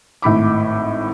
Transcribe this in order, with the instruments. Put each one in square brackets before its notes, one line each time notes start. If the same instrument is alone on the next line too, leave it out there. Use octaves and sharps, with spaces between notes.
[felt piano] G#1 A2 B5 D6